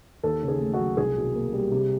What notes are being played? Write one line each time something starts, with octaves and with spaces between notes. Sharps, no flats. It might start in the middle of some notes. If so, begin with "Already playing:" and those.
D#2 A4
C#3
G#4
A3
F#4
F#3
C2 G#4
B2
A#3
G3
C3